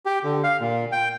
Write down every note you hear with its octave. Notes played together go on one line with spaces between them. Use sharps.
G4
D3
F5
A#2
G5